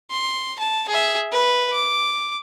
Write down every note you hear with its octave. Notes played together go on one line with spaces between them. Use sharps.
C6
A5
G#4 E5
B4
D6